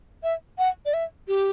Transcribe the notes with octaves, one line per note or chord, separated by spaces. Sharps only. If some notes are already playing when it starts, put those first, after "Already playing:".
E5
F#5
D5
E5
G4